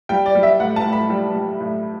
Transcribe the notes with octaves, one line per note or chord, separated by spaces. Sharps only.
G3 G5
D5
G3
E5
A2 F#5
A5
A2
B5
G3
G3
A2